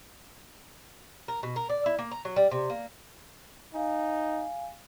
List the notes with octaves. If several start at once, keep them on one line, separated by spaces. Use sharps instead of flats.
A#4
B2
A#4
D5
E4
A#3
A#5
F#3
G3
C3
A#3
D#4 F5 G#5